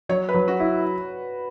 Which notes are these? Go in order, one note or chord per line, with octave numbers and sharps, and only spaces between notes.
F#3 C#5
B4
F#3
F#4
E4